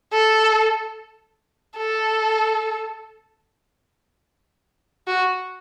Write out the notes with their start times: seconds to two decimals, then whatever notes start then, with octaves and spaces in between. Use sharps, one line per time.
0.13 A4
1.77 A4
5.07 F#4